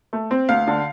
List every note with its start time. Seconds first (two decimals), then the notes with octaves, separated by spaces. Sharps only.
0.13 A3
0.31 C4
0.49 D2 F5
0.68 D3